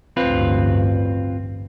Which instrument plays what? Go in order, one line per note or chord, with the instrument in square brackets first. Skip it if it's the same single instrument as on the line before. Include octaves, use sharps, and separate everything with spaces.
[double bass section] A1 D2 G2 [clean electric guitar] C4 F4 B4